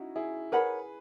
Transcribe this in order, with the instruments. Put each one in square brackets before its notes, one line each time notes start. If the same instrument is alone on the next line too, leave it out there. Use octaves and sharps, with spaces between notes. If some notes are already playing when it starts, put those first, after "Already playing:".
Already playing: [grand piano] C#4 D#4 E4 F#4
E4 G#4
[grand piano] G#4 B4 [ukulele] A#4 C#5 F#5 B5